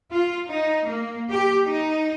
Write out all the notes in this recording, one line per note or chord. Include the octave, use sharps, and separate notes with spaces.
F4
D#4
A#3
G4
D#4